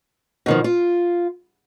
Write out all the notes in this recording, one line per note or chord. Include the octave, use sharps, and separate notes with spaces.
B2 D#3 F3
F4